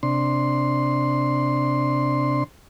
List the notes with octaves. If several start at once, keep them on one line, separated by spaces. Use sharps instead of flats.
C3 D4 C6